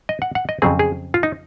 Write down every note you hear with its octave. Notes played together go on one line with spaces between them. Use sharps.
D#5
F#5
F#5
D#5
F2 C#3 F#3 C4 G#4
G#4
F4
D#4